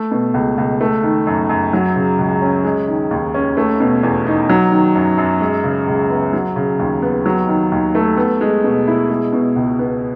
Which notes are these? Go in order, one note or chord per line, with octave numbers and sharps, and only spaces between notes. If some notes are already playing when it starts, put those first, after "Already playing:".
Already playing: A3
B2
C#2
C#2
A3
D#3
F#2
F#2
F#3
C#3
C#2
C#4
G#3
D#3
D#2
C#4
A3
B2
E2
D#4
F#3
D#3
F#2
F#2
G#3
C#3
C#2
B3
F#3
C#3
D#2
B3
F#3
D#3
D#2
A3
B3
G#3
B2
E4
G#3
B2
C#2
B3